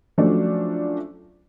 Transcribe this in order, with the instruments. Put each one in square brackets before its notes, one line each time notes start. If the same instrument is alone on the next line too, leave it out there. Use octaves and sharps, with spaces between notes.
[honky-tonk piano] F3 F#3 A3 C#4 D4